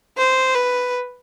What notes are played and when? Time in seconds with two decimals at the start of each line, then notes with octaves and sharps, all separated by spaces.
0.18 C5
0.54 B4